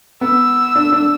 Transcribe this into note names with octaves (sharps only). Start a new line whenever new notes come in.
B3 E6
D4
D4